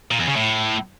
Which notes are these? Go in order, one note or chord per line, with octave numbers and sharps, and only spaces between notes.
A#2
E2
C#3
A2